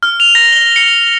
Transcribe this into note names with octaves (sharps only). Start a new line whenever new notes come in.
F6
F7
A#6
G7
C#7